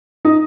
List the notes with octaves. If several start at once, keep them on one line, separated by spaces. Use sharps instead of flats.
D#4